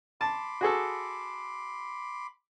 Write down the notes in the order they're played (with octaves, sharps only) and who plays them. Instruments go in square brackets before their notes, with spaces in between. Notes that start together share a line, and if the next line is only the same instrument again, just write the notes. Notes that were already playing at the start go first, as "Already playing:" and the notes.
[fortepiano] A5 [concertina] B5 C6 D6
[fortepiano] F#4 G#4 A4